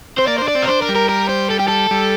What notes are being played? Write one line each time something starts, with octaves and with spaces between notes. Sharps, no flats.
C4 C5
A#3 D5
D4 C5
D5
C4
A#4
D4 C5
A#4
G3
A#4
A#4
C5
A4
G4
A4
G3